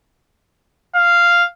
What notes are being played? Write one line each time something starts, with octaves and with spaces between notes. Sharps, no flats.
F5